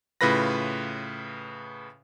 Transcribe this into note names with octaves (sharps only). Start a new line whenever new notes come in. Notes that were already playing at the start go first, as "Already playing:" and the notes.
A2 C#3 F4 B4 B5 A#6